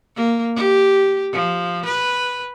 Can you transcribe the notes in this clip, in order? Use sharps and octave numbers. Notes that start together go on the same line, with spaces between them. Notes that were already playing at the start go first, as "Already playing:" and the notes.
A#3
G4
F3
B4